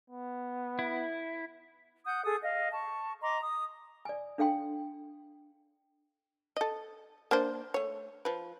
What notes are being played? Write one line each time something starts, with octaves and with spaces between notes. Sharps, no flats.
B3
E4
F#5 D#6 G6
G#4 A4 D#6
D#5 F5
A5 C#6
D#5 A#5 C6 D6
D#6
D5 G#5
D4 A4 F5 G5 C6
A4 D#5
A#3 D4 C5
A3 C#5
F3 B4